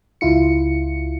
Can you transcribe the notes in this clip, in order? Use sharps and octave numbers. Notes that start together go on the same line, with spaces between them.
C#2 E4 F4 C#7